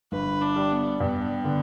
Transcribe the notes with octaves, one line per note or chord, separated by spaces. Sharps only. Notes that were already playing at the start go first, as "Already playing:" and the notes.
G1 B4
D4
G3
B3
G2 B3
D3